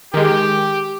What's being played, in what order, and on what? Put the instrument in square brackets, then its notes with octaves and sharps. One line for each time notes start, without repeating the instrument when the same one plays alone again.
[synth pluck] D#3 G#3 [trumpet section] G4